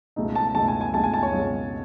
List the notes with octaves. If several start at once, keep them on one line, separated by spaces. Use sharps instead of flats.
C#2 B2 A3 D#4
A5
C#2 B2 A3 D#4 A5
G#5
G#5
C#2 B2 A3 D#4 A5
G#5
A5
C#5
C#2 B2 A3 D#4